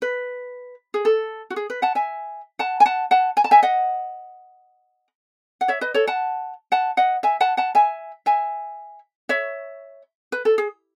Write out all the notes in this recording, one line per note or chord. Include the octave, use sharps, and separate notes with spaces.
B4
G#4
A4
F#4
G#4
B4
F#5 A5
E5 G#5
F#5 A5
G#5
F#5 A5
F#5 A5
G#5
A5
E5 G#5
D#5 F#5
F#5
C#5 E5
B4 D#5
A4 C#5
F#5 A5
F#5 A5
D#5 F#5
E5 G#5
F#5 A5
F#5 A5
E5 G#5
E5 G#5
C#5 E5
B4
A4
G#4